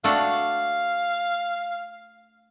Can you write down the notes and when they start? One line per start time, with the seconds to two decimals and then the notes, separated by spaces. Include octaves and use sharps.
0.04 A3 D4 F#4 F5